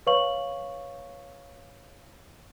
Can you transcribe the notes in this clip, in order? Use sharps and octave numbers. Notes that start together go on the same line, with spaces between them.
B4 C#5 F5 C#6 F#7